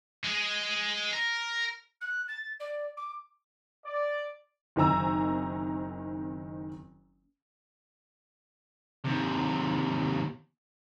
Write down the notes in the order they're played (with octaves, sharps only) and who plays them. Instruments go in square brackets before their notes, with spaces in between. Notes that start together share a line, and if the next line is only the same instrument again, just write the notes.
[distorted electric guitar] G#3 G#4
A#4
[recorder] F#6
A6
D5
D6
[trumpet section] D5
[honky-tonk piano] F#1 D#3 C4 G#5 A#5 E6
[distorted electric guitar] D#2 C3